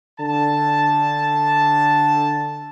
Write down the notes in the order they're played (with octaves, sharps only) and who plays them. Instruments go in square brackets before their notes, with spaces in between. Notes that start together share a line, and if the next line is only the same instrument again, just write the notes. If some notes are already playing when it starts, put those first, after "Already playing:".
[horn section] D3 A5